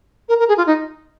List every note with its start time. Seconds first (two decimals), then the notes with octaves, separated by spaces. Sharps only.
0.29 A#4
0.39 A#4
0.48 G#4
0.58 F4
0.67 D#4